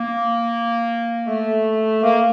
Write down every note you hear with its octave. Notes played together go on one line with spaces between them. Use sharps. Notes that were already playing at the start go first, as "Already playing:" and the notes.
Already playing: A#3
A3
A#3